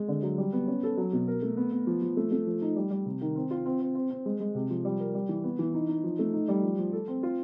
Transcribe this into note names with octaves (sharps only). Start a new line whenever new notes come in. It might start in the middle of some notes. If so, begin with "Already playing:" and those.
Already playing: G#3
D3
F#3
G3
B3
C#4
A4
F#3
B2
A#4
A3
B3
B3
F3
F3
A3
A3
F3
D#4
G3
G3
C3
D#3
C4
F4
C4
C4
C4
C4
G#3
G#3
C3
F3
G3
A#4
G3
E3
B3
E3
D#4
D#4
F3
A3
D#4
G3
F3
F3
A4
C4
F4